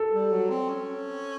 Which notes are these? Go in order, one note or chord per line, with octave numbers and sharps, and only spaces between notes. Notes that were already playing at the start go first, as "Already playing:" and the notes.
Already playing: A4
G3
F#3
C4
C#4